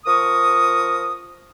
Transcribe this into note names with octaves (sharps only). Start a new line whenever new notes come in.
F3 A#4 C#6 D#6